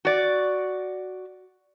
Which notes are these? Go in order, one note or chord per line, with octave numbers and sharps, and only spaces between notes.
F#4 D5